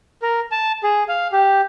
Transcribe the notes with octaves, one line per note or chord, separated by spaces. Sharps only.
A#4
A5
G#4
F5
G4